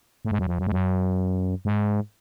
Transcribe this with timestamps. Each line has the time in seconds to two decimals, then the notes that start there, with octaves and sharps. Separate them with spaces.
0.25 A2
0.31 G#2
0.39 F#2
0.47 F2
0.59 F#2
0.67 G#2
0.72 F#2
1.65 G#2